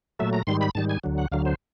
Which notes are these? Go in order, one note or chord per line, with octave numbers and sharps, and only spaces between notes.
A#2 F#3 A3 E5
A#5
G#2 D#3 G3 C6
B5
G#2 D#3 G3 A5
G#5
D2 D3 F#3
F#5
D2 D3 F#3 F5
C5